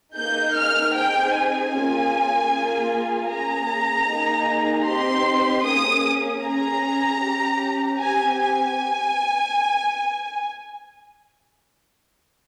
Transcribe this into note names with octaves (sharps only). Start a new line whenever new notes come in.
A#3 D#4 G#4 G6
F6
C4 D#4 G#4 G5
G#5
A#3 C#4 F4 G#4
A#3 F4 G#4
A#3 C#4 G#4 A#5
A#3 D#4 G#4
C4 D#4 G4 C6
A#3 C#4 G#4 D#6
C#4 G#4 A#5
C#4 G4
C4 G4 G#5
G#5